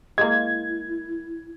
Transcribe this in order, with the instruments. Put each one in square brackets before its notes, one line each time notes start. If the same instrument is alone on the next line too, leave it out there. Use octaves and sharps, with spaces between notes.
[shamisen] G#3 A#3 [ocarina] E4 [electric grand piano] G#6